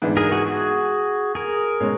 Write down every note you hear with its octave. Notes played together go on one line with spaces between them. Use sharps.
G#2 E3 G#3 B3 D4
G#4 A#4
F#4 G#4
F#4 G#4
G#4 A#4
B2 G#3 C#4